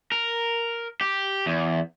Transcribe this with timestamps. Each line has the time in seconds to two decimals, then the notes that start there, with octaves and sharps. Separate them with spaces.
0.12 A#4
1.01 G4
1.46 E2